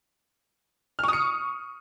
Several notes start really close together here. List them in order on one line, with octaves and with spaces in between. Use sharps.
F6 C#6 D#6 C#7